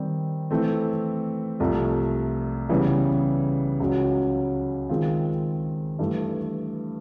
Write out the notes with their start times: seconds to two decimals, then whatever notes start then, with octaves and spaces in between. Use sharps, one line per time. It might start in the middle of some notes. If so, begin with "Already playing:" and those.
Already playing: D#3 G3 C4
0.51 E3 A3 C4
1.60 C2 C3 F3 A3
2.69 C#3 E3 G3 B3
3.80 C#2 C#3 F#3
4.89 D#3 G#3 C4 F4
5.99 G2 E3 A3